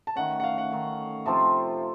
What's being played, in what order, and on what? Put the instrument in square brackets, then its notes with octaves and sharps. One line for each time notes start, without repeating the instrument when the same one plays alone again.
[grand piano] A5
[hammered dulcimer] D#3 A3 C#4 [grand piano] F#5
[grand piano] F#5
F5
F#5
[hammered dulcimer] D#3 A3 C#4
[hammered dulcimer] C3 F3 C4 F4 [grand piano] A5